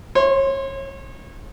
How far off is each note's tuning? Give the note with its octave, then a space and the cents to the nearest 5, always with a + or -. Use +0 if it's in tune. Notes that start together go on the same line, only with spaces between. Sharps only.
C#5 -30 C6 +0